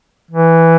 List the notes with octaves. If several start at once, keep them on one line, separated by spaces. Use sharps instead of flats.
E3